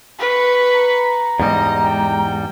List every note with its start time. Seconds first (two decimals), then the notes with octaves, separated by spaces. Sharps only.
0.19 B4 C#6
0.75 A#5
1.40 E2 G#2 G3 D#5
1.83 G5